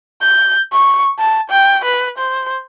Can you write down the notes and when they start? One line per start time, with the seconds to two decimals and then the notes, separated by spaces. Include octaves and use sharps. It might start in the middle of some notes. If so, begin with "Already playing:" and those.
0.21 G6
0.72 C#6
1.19 A5
1.50 G5
1.85 B4
2.18 C5